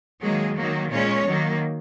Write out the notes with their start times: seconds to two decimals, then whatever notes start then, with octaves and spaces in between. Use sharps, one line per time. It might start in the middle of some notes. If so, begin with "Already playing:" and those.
0.22 D#3 F#3 G#3 A#3 G#4
0.57 D#3 F#3 A#3
0.92 A#2 G#3 C#4 C#5
1.27 D#3 F#3 A#3